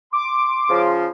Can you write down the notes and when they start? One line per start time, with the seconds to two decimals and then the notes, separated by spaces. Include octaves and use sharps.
0.13 C6 D6
0.70 C#3 F3